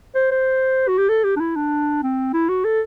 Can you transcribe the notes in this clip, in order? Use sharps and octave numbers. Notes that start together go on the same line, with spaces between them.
C5
C5
F#4
G4
A4
G4
D4
E4
D4
C4
E4
F#4
A4